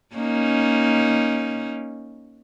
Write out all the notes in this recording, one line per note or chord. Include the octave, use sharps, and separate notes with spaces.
A#3 C#4 D#4